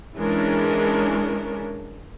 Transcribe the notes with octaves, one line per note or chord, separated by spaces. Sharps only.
E3 G#3 C#4 D4 A#4